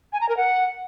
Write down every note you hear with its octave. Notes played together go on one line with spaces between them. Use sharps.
G#5
A#5
A#4
F#5